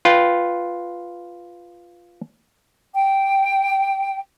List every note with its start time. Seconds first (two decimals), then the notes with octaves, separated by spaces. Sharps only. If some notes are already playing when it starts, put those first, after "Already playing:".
0.05 F4 B4 G5
2.94 G5